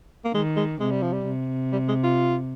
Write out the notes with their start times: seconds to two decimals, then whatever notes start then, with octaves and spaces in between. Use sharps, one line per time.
0.25 A#3
0.34 D#3 G#3
0.57 G#3
0.80 C3 G#3
0.91 G3
1.02 F3
1.13 G3
1.27 C3
1.73 G3
1.88 G#3
2.04 F4